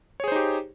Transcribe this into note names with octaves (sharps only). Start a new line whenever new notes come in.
D#4 G4 G#4 C5 C#5